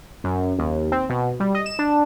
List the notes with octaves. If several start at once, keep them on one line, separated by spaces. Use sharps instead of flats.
F#2
D#2
C4
B2
G3
D#5
E7
D4